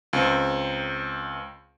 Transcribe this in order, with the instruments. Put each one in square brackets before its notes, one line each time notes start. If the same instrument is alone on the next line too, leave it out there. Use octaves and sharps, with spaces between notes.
[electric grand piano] C#2 C4